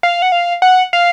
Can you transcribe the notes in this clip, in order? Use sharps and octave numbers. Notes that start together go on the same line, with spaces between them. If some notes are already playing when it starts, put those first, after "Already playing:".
F5
F#5
F5
F#5
F5